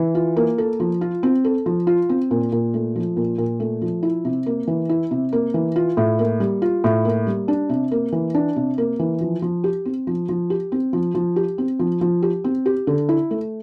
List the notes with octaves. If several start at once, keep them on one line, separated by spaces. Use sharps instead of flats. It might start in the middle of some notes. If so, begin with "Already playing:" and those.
Already playing: E3
F4
A#3
A4
F3
F4
C4
A4
F3
F4
C4
A#2
A#2
A3
F3
A#2
A#2
A3
F3
E4
C3
A#3
E3
E4
C3
A#3
E3
F4
A2
A#3
G3
F4
A2
A#3
G3
D4
C3
A#3
E3
D4
C3
A#3
E3
F3
F3
G4
C4
F3
F3
G4
C4
F3
F3
G4
C4
F3
F3
G4
C4
G4
D3
E4
A3